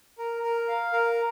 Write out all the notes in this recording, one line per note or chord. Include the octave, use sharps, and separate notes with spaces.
A#4
A#4
F5
A#4